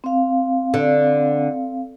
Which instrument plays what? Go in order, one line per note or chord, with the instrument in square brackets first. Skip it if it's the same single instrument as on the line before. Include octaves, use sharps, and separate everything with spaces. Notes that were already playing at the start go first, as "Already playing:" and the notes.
[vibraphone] C4 F5
[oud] D3